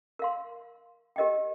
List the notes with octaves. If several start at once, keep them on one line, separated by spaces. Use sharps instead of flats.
A#4 F5 C6
G4 A#4 D#5 G5